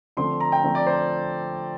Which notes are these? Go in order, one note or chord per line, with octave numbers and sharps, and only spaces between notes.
D3 F3 A3 C4 C6
A#5
G5
D3 F3 A3 C4
D5
C5